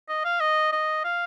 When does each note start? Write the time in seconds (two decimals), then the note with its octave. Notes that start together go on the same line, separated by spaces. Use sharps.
0.09 D#5
0.25 F5
0.40 D#5
0.72 D#5
1.04 F5